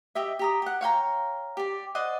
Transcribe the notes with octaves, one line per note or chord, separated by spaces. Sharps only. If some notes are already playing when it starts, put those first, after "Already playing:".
G4 D#5 E5
G4 A#5 D#6
G4 F#5
C#5 F5 G5 A#5
G4 D5
C5 D5 D#5 F#5